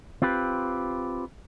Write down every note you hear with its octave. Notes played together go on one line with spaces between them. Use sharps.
C4 F4 G4 B4